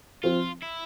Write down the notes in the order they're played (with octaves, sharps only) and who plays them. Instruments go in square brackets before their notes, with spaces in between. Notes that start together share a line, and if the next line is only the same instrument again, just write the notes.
[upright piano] F3 C4 [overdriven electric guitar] F4
[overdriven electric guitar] E4